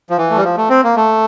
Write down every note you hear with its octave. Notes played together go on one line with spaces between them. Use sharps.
F3
E3
A3
G3
F3
A3
C4
A#3
A3